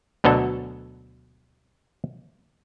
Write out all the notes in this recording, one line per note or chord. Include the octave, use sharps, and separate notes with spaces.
D2 B2 D3 F#3 A4